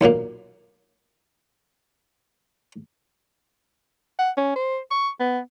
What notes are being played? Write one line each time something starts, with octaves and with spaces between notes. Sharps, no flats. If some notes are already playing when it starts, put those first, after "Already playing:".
B1 F#2 A#2 A#3
F#5
C#4
C5
C#6
B3